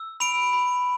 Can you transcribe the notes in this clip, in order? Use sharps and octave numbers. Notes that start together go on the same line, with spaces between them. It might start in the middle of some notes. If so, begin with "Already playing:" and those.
Already playing: E6
B5 D7 F7
B5